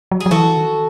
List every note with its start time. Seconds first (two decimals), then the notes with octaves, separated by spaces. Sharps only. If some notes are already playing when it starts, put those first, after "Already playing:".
0.11 F#3
0.20 G#4
0.26 F#3
0.31 E3 F#4 A4
0.57 D#3